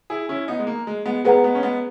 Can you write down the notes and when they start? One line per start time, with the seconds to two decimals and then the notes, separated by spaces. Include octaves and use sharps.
0.10 E4 G#4
0.29 C#4 E4
0.48 B3 D#4
0.59 G#3
0.67 A#3
0.87 G#3
1.06 G#3 B3
1.24 G#3 B3 G#4 B4 F#5 A#5
1.44 G#3 B3
1.55 C#4
1.63 G#3 B3